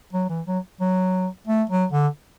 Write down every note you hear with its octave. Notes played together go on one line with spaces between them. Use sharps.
F#3
E3
F#3
F#3
A3
F#3
D3